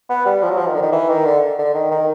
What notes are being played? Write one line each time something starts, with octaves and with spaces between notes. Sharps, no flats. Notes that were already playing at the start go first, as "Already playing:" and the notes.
B3
G3
F3
F#3
F3
D#3
D3
D#3
E3
D#3
D3
D3
D#3
D#3